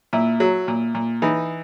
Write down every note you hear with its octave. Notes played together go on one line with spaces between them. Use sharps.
A#2 E4
F#3
A#2
A#2
E3 D#4